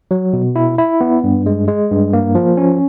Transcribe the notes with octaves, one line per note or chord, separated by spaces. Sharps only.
F#3
B2
E4
E4
B3
G2
G#3
G#3
G2
A#3
F3
C#4